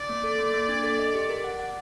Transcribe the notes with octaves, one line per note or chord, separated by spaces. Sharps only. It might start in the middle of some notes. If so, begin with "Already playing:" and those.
Already playing: D5
A#3
A4
A#3
A#3
D4
A4
D#5
G4
A#4
F#5
F#5